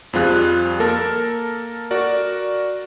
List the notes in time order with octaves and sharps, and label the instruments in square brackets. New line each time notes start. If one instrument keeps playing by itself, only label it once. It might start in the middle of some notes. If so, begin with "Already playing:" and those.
[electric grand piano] F2 G3 C4 F4 G#4 F#6
A#3 A4 A#4 A5
F#4 A#4 D5